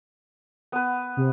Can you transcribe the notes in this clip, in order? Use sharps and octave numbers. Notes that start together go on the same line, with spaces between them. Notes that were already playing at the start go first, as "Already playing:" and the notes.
B3 B4
C3